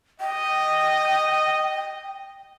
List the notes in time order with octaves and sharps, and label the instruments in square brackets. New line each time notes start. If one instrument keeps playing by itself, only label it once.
[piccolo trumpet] D#5 [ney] G5